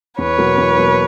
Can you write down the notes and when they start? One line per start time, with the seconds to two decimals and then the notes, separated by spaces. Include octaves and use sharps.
0.18 E2 B4 C#5
0.38 B2 F#3 A#3
0.58 E2
0.77 B2 F#3 A#3